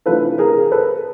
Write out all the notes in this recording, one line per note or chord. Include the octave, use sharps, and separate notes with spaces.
C3 E3 A3 D4 F4 A4 B4
G#4 A#4
A4 B4